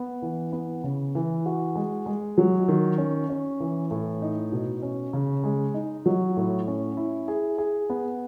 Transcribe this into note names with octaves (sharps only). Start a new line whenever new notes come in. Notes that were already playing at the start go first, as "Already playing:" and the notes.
Already playing: B3
E3
B3
C#3
E3
F#4
G#3
G#3
F#3
D#3
C#4
C#4
E3
A2
D#4
B2
C#4
C#3
G#3
D#4
F#3
A2
C#4
E4
G#4
G#4
B3